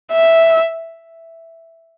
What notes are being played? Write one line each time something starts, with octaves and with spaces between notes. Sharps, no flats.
E5